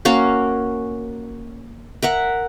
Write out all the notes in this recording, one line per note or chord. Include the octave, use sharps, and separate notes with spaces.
A#3 C#4 F#4 F5
A#4 E5 F#5